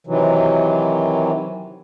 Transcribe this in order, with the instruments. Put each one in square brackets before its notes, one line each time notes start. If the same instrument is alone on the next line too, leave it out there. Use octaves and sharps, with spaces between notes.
[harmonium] C3 D#3 E3 F#3